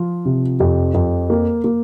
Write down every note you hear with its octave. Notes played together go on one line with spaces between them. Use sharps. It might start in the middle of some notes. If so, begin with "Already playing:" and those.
Already playing: F3 F4
C3
F2 G4
F2
A#3
A#3